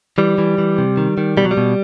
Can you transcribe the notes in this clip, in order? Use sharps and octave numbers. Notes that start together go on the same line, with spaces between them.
E3 G3
E3
E3
C3
D#3
D#3
B2 G3
F#3
G3
B2